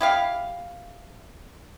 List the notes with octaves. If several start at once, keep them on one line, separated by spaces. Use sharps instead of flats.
E4 G4 F5